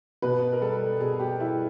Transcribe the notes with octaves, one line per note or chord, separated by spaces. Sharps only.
B2 B4
A#4
G3 A4
B2 G#4
G4
G3 E4